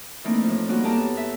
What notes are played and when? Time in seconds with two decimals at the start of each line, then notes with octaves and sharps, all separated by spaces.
0.24 E3 A3 A#3 C4 D4 D#4
0.43 A2 F3
0.68 G3 A#3 B3 C#4 D#4 F#4
0.84 E2 A#3 G4 A4 A5 A#5
0.98 B3
1.17 E5